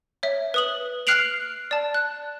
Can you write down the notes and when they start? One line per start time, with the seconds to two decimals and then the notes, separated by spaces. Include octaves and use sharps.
0.23 C#5 E5
0.54 B4 D#6 F#7
1.07 F6 F#6 C7 D7 F7 F#7
1.71 D5 A5
1.94 F#6